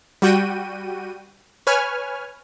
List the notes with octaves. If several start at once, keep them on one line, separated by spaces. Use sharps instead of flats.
G3 F#4 G5 D#7
B4 C#5 G#5 F6